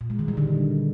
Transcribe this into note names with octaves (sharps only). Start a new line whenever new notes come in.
A#2
G#3
D#3
G3
D3